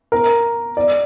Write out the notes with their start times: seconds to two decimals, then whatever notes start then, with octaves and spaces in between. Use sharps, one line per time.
0.12 A#4
0.77 D5